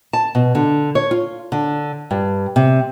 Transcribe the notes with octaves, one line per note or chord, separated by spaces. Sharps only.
A5
B2
D3
C#5
F4
D3
G2
C3